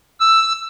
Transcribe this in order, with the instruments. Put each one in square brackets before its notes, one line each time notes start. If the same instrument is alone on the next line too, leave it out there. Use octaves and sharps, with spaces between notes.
[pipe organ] E6